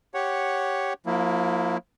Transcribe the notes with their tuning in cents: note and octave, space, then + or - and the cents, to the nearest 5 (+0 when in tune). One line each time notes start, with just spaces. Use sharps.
G4 +0 C#5 +0 F#5 +0
F3 +40 A#3 +0 E4 +0